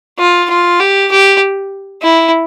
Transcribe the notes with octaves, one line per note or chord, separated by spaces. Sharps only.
F4
F4
G4
G4
E4